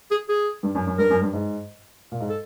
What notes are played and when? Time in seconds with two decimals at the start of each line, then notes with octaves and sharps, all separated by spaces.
0.11 G#4
0.29 G#4
0.63 G2
0.75 F#2
0.87 F#2
0.98 G2 A#4
1.10 F#2
1.22 G2
1.33 G#2
2.12 A#2
2.20 G#2
2.30 A4